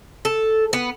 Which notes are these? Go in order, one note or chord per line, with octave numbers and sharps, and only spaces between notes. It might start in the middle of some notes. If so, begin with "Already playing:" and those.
A4
B3